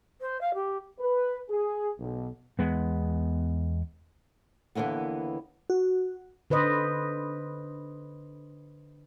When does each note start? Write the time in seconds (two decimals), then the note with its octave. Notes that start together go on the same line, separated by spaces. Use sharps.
0.21 C5
0.41 F5
0.54 G4
1.00 B4
1.50 G#4
2.00 B1
2.59 E2 G#3 B3
4.75 D#2 D3 E3 A#3 B3
5.70 F#4
6.50 D3 B4 C5 D#5